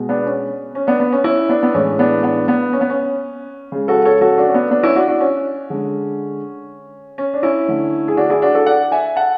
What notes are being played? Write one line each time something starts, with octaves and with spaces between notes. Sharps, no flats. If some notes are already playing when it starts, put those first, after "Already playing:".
Already playing: B2 G#3
B3 D4
C#4
C#4
B3 D4
B3
C#4
C#4 E4
B3 D4
B3
A2 E3 G#3 C#4
B3 D4
B3 D4
B3
C#4
B3
C#4
C#3 G#3
F#4 A4
A4 C#5
F#4 A4
D4 F#4
C#4
B3 D4
B3 D4
C#4 E4
D4 F#4
D4 F#4
C#4
D3 G#3
C#4
D4
C#4 E4
D3 A3
G#4
D4 F#4
E4 G#4
D4 F#4
F#4 A4
D5 F#5
E5 G#5
F#5 A5